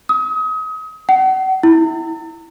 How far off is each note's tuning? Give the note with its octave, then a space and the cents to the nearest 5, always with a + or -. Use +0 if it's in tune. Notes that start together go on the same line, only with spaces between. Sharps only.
D#6 +35
F#5 +40
E4 -10